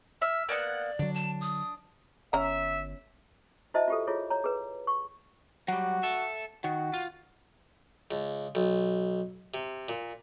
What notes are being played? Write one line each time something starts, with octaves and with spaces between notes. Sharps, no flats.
E5 F6
A#3 B3 D5 F#5
D3 F#3 D4
A5
D#6
G1 C#4 E5 A#5
E4 F#4 C5 D#5 E5 A5
F4 G4 A4
E4 F4 G#4 C#5
C#5 A#5
G#4 B4
C#6
F#3 G3 F#4
A4 E5
D#3 F#4
F4
C#2
B1
C3
A#2